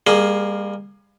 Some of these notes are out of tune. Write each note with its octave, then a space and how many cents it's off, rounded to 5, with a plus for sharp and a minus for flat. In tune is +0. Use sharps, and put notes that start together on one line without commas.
G3 +40 A#3 +0 G#4 +10